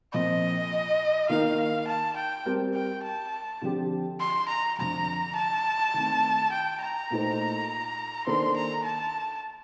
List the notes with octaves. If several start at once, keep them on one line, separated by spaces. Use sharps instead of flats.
A#2 F3 C4 D#5
D#3 A#3 D#4 A#4 F5
A5
G5
G3 C4 G4 A#4
G5
A5
D3 F3 C4 G4
C6
A#5
F2 D3 F3 A#5
A5
D#3 A3 C4
G5
A#5
A#2 A3 D#4 A4 C5
D#3 A#3 D4 A4 C5 C6
A#5
A5